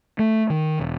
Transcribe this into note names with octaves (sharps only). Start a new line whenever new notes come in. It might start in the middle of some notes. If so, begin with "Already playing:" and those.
A3
D#3
E1